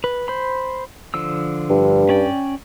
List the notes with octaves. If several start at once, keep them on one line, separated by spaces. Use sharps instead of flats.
B4
C5 B5
D3 F3 E6
G2
C#4 D5 G5